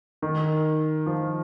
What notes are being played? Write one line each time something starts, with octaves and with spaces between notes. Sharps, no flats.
D#3
F3